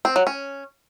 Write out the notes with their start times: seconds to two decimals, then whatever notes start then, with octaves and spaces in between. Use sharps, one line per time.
0.05 C4
0.16 F#3
0.27 C#4